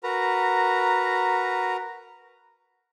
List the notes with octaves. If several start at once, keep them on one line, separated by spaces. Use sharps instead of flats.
F#4 A#4 B4 A#5